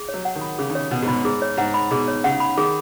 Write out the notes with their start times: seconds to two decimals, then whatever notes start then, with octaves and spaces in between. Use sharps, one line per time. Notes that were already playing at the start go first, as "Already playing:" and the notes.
Already playing: G#4
0.09 C#5
0.14 F#3
0.25 F#5
0.36 D#3
0.41 B5
0.58 C#3 G#4
0.70 D#3
0.75 C#3 C#5
0.91 B2 F#5
1.02 G#2
1.08 B2 B5
1.25 G#2 G#4
1.42 C#5
1.57 G#2 F#5
1.74 B5
1.91 B2 G#4
2.08 C#5
2.24 C#3 F#5
2.40 B5
2.58 D#3 G#4